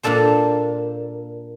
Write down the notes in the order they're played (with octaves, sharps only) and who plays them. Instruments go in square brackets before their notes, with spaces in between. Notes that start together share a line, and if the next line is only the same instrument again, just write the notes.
[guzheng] A#2 A#3 D4 A4 C5